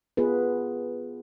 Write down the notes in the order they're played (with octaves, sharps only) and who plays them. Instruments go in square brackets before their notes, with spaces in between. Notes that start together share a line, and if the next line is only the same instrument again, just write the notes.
[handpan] B3 F4 G#4 B4